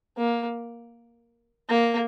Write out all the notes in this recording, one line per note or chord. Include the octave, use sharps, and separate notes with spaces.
A#3
A#3